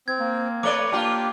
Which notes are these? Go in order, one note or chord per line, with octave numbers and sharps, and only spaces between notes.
C4 G#6
A#3
A3 B4 C#5 D5 D6 G7
A#3 D4 F4 G4